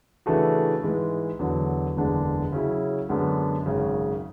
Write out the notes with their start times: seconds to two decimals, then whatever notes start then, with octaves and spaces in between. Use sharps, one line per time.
0.26 C#3 E3 A3 D4 F#4
0.83 G#2 E3 G#3
1.39 E2 D3 F#3
1.96 F#1 E2 D3 G#3 D4
2.52 C#3 F#3 C#4 E4
3.09 F#2 D3 G#3 B3 D4
3.66 G#1 F#2 C#3